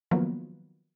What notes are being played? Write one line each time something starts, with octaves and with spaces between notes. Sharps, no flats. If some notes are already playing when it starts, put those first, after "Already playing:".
D#3 F3 F#3 A#3 B3